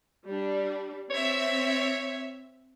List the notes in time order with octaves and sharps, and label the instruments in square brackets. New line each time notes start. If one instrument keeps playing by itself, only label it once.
[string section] G3 D4
[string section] C4 E5 [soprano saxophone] C#5